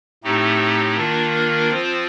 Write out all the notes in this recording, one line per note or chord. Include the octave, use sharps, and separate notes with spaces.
A2 A3 C4 D#4 G4
D#3 A#3 D4 F4 A#4
F3 C4 F4 C5